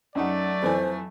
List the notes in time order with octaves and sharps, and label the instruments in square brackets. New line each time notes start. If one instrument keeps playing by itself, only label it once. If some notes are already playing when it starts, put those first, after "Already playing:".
[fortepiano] F#2 D#4 F#5 [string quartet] F#3 A3 [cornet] D5
[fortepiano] F2 E3 G#5 [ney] C5